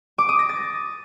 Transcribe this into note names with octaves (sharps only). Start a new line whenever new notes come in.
D6
D#6
A#6
A6